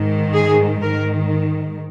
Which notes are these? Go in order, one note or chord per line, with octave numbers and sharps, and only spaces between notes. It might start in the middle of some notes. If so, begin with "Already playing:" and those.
Already playing: G#2 D#3
G#4
G#2 D#3 A#4